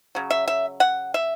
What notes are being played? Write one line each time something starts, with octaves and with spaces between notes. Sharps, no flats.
C#3 F#3
E5
E5
F#5
E5